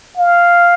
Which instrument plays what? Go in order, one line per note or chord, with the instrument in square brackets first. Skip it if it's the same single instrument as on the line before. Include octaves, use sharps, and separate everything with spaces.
[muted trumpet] F5